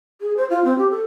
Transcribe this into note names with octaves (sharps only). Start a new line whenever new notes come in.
G#4
C5
F4
C4
G4
A4